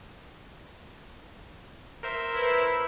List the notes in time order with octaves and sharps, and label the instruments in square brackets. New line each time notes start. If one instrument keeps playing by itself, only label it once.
[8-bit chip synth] A#4 C5 E5
[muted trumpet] E4 [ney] B4